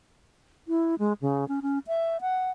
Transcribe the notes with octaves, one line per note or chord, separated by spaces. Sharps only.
E4
G#3
C#3
C#4
C#4
E5
F#5